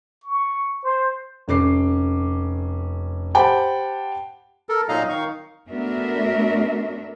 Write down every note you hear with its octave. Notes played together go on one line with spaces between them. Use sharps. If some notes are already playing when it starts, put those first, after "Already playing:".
C#6
C5
F1 C#4 D6 C7
G4 C5 F#5 G5 A5 B5
A4 A#4
A#2 F#3 D#4 D#5 F5 A#5
D#3 D#4 F5 C#6
A3 B3 D4 F#4 A#4 E5